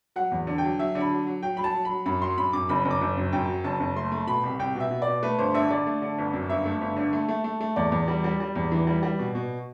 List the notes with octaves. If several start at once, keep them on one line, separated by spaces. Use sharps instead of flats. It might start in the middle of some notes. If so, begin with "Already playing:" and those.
F#3 F#5
E2
D3
G5
F#3
F#3 E5
D3
B5
F#3
F#3
F#3 G5
F#3 B5
A5
F#3
F#3 B5
F#2 B5
F#3 C6
F#2 B5
F#2 D6
F#1 B5
F#1
D6
F#1
F#2
F#2 G5
F#3
F#1 A5
F#1
A3 C6
A3
B2 B5
C2
C2 G5
B2
E5
B2
D5
B2
A3 B4
G1 C5
D3 E5
D3 D5
A3
D3
G1
F#2
G1 E5
A3
G1
D3
A3
A3
A3
A3
E2 D5
E2
G3
G3
G3
E2
E3
G3
G3
B2
B2